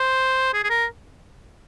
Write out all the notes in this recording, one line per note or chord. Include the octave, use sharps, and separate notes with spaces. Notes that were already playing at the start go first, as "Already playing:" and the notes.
Already playing: C5
G#4
G#4
A#4